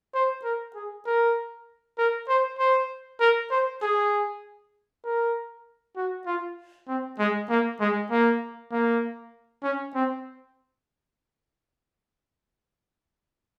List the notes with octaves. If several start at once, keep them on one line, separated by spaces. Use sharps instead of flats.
C5
A#4
G#4
A#4
A#4
C5
C5
A#4
C5
G#4
A#4
F#4
F4
C4
G#3
A#3
G#3
A#3
A#3
C#4
C4